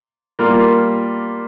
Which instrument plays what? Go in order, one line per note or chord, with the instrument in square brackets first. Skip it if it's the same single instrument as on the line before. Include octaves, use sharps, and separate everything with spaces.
[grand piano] G3 A#3 F4 A#4